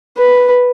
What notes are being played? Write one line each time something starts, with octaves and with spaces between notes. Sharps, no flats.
B4